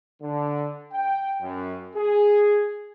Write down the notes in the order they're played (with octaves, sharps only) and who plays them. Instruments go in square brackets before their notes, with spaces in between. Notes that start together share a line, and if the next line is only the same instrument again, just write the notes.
[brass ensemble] D3
G5
F#2
G#4